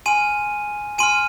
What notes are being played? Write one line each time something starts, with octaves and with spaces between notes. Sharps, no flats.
G#5 C6 F6 D#7
G#5 C6 F6 D#7